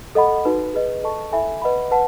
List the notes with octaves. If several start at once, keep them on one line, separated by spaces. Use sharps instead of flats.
A4 D#5 F#5 B5
D#4 F#4 B4
G#4 B4 D#5
A4 D#5 A5 C#6
E4 A4 E5 G#5 B5
B4 D#5 F#5 B5
B4 F#5 A5